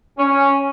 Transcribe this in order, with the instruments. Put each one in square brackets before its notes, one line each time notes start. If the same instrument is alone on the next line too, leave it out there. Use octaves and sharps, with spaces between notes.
[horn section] C#4